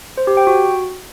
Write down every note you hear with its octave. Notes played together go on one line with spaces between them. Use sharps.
C5
G4
G5
F#4